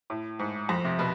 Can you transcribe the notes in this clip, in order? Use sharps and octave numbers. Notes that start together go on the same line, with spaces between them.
A2
G#2
F2
C3
B2